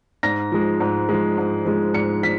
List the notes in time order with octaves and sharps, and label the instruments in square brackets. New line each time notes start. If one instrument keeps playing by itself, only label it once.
[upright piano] G#2 A#6
F3 G#3
G#2
F3 G#3
G#2
F3 G#3
G#2 C#7
F3 B6